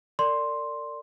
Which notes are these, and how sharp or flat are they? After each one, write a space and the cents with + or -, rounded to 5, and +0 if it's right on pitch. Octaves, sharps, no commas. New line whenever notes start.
A#4 -35 D5 +0 C6 +0